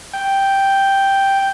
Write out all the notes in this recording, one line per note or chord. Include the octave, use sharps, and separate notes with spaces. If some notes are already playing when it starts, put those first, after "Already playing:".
G5